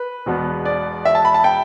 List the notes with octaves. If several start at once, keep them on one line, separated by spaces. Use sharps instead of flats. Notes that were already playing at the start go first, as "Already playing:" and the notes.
Already playing: B4
E1 E2 B2 B3
D5
E5
A5
B5
A5
G5